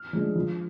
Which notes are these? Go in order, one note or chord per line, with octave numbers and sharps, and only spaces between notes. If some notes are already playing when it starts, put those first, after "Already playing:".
Already playing: F6
F3 G#3 D4
F3